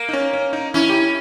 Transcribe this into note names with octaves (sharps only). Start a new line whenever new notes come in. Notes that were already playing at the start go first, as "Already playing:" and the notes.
Already playing: A#3
D#4
C#4
C#4
D#4
C#4 E4
G4
E4